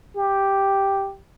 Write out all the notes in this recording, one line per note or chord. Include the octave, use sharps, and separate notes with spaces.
G4